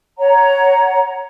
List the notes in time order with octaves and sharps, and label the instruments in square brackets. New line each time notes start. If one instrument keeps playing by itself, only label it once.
[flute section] C#5 F#5 A#5